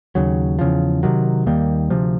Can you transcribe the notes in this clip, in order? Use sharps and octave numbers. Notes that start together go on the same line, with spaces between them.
D#2 C#3 F#3
E2 C#3 F3
C3 D#3 F#3
D#2 D#3 G3 A#3
D2 C3 F3